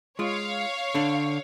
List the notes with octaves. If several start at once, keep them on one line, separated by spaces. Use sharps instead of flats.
G#3 F4 C#5 F5
D3 D4